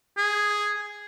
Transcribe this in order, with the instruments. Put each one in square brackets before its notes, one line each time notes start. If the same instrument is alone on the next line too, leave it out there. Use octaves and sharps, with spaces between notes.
[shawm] G#4